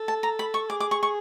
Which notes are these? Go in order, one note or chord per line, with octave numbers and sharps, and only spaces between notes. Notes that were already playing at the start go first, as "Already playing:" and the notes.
Already playing: A4
A5
A#5
B5
C#6
G#4 D6
D6
C#6
C#6